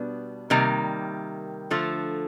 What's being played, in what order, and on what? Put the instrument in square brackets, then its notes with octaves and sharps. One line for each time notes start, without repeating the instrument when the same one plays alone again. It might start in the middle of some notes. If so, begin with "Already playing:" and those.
Already playing: [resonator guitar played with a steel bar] B2 G3 B3 D4
C3 D#3 G3 A#3
D3 F3 A3